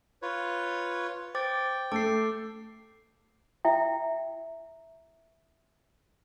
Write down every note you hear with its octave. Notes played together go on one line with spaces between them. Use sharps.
F4 B4 C#5
C5 G5 D6 A6
A3 A4 D6 C7
E4 E5 G5